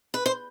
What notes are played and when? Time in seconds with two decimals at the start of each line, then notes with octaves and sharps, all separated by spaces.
0.14 B4
0.26 C5